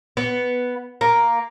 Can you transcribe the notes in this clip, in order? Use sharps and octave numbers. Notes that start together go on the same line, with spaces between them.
B3
A#3